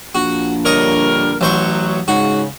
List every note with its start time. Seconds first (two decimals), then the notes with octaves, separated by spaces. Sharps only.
0.15 A#1 F#4
0.66 D3 G3 A#4 C#5 D#5
1.41 A1 F#3 C5 C#6
2.08 G#2 C#3 F#4